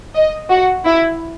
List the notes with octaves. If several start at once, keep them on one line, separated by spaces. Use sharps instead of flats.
D#5
F#4
E4